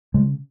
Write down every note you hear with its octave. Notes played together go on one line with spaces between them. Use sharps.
C#3 G#3